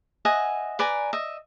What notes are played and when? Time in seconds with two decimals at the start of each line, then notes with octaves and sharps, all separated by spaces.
0.25 D#5 E5 F#5 G#5
0.79 B4 D5 G#5 A#5
1.13 D#5 E5